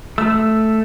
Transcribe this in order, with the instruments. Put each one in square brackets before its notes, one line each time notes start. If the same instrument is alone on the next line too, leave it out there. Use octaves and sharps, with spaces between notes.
[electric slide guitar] A3 [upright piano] E6